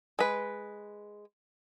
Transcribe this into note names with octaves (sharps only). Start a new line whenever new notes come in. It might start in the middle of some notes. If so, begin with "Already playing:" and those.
G#3 B4